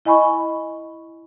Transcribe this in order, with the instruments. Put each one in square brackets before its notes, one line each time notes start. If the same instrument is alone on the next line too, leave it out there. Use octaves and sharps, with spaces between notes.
[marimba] E4 D#5 G#5 B5 C#6